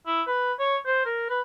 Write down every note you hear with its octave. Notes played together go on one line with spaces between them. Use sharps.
E4
B4
C#5
C5
A#4
B4